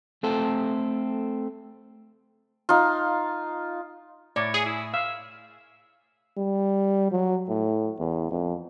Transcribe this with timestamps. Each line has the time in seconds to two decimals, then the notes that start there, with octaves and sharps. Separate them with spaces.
0.23 A3 C4 A4
2.69 D#4 F4
4.36 A2 C#5 D5
4.54 G#4
4.66 E4
4.94 E5 F5
6.37 G3
7.12 F#3
7.48 A2
7.99 E2
8.31 F2